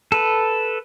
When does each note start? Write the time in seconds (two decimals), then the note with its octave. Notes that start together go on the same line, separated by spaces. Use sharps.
0.12 A4 B4